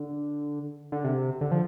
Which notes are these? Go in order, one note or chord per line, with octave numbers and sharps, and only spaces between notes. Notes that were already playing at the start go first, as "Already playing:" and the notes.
Already playing: D3
D3
C3
D3
F3